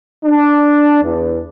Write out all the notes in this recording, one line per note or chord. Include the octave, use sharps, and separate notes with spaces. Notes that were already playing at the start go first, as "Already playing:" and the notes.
D4
E2